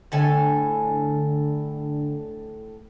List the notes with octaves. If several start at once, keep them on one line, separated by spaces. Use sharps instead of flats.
A2 D3 A4 G#5